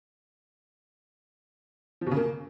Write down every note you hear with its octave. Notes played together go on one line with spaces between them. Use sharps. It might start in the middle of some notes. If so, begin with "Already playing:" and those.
F3
B2
C#3
A#3